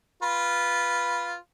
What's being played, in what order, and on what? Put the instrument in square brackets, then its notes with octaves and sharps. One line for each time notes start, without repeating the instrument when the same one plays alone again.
[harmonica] F4 B4